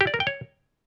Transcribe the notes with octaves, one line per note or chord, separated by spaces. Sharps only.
G4
D5
A#4
G5
C#5